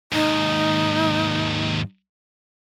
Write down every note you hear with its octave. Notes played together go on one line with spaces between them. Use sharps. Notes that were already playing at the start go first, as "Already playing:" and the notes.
D#2 G#2 D#4